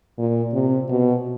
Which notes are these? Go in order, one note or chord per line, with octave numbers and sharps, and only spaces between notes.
A#2
C3
B2